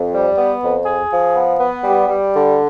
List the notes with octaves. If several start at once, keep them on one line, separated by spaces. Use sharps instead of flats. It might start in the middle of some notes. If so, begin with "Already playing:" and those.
Already playing: F2
G3
B3
F2
G#4
F3
B3
B3
G3
G3
D3